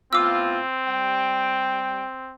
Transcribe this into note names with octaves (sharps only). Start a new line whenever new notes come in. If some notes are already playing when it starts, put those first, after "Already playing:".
A2 B3 C4 F4 D6 E6
G3 G5